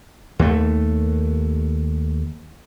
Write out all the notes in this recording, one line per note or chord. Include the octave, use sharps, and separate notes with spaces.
D#2 A3